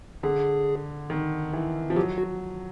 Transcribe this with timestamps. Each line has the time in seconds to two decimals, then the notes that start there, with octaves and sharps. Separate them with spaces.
0.23 D3 G#4
1.10 D#3
1.53 E3
1.90 F3
1.96 F#3 G4
2.18 F#4